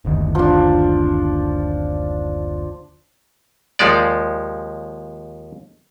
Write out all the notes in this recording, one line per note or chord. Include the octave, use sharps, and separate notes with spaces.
F#1 D2 D#3
F3 D4
D#2 F3 G#3 D5